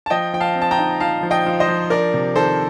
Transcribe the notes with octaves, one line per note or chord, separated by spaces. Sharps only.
A5
F3 D#5 G5
F3 G5
F5 A5
C4
A5
G5 A#5
D#4
F3 F5 A5
F3
D#5 G5
F3
C5 D#5
F3
D4 A#4 D5
C3
D#3 A4 C5